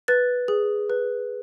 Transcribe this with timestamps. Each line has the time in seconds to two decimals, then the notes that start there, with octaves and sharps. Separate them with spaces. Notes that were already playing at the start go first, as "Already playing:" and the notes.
0.08 B4 A6
0.48 G#4
0.90 B4